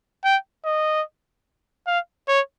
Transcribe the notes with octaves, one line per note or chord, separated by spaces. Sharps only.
G5
D#5
F5
C#5